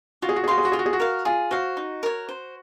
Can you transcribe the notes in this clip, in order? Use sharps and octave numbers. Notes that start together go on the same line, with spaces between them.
F4 F#4
G#4
F#4
G#4
F#4 C5 F5 C6
G#4
F#4
F4 G#4
F#4
G#4
F#4
A#4 F5
F4 G#4
F#4 C5 F5
D#4
A#4 C#5
C5